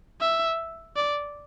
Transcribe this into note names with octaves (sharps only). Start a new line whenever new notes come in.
E5
D5